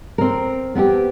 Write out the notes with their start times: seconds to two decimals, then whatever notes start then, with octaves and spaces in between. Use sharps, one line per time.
0.18 C4 A#4
0.75 B3 C4 E4 G4